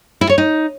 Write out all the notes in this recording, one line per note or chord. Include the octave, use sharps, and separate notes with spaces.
E4
C#5
D#4